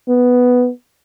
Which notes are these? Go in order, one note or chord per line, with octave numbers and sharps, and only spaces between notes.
B3